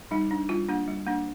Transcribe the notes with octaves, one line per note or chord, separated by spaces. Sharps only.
G3 D#4
D4
G3 F4
A#3 D4
G3
A#3 D4